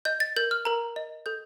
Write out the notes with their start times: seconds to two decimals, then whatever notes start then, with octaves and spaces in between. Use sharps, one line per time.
0.05 D#5 G6
0.20 A6
0.37 A#4 G6
0.51 F6
0.65 A#4 A#5
0.96 D#5
1.26 A4 G6